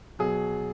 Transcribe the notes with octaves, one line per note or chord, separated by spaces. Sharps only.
B2 F#3 G#4